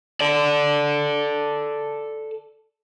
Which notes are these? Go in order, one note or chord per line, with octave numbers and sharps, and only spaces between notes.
A4 D5